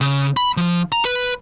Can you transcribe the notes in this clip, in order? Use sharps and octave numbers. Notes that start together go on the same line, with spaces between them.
C#3
B5
F3
A#5
B4